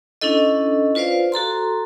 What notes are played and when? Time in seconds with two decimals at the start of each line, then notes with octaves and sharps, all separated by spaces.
0.21 C#4 D4 E4 A4 D#5
0.95 F4 B4 C5 D5 F5
1.32 F#4 A4 A#5 C6